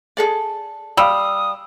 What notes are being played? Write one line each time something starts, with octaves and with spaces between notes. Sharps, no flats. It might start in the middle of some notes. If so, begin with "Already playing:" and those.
G#4 A4 D5
G3 F5 D#6 E6